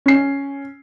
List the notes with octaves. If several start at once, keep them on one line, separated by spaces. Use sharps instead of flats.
C#4 C7